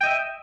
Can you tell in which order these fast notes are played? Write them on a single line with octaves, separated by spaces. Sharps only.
G5 D#5 E5